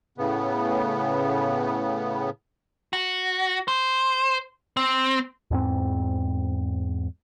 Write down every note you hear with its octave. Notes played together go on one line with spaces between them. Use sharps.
A2 C#3 B3
F#4
C5
C4
E2 G#2 C4